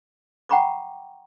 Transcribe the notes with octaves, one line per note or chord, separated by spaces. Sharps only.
F#5 G5 A#5 B5 C#6 D6